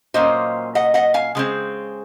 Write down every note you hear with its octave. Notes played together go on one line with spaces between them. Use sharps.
A#2 F#3 A#3 C#4 C5 D#5
D#5 F#5
D#5 F#5
F5 G#5
C#3 G#3 C4